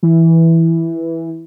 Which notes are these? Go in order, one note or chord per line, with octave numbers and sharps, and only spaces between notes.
E3